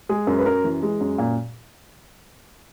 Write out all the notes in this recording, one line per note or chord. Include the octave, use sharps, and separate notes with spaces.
G#3 G#4
F#2 A#4
B4
F#2 A#4
E3
G#3
F#2
A#2